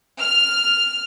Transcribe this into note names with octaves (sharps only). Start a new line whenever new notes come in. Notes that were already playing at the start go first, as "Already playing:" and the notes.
F6